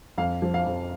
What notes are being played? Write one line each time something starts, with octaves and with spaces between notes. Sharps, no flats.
F2 F5
F3
F5
F2